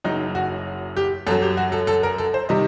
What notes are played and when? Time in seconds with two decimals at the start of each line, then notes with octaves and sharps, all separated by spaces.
0.04 F#1 F#2 F#3 D#4
0.35 F#4
0.96 G4
1.27 F#2 A4
1.31 F#3
1.42 G4
1.57 F#4
1.72 A4
1.87 A4
2.03 A#4
2.18 A4
2.34 C5
2.49 C3 D#3 G3 D#5